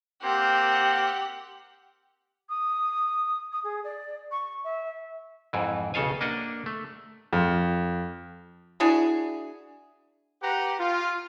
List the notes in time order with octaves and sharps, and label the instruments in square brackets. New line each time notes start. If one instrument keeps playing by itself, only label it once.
[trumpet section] A#3 C4 [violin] G4 F#5
[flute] D#6
D#6
G#4
D5
C#6
E5
[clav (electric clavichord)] F2 G#2 E3
B1 C#3 A4 F5 G#5
A#3 D4 D#5 F#5
A3
[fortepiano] F2
[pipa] D4 E4 F#4 G#4
[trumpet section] G4 B4 F#5 A#5
F4